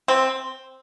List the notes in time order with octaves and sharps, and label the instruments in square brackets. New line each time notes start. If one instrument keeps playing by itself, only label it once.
[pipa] C4